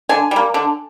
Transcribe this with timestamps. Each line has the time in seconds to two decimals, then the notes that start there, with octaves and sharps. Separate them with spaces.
0.09 D3 G#5
0.31 G3 A#3
0.54 D3